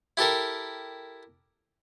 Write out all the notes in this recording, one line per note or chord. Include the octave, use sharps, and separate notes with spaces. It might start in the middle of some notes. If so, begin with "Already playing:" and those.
E4 G4 A4 A#4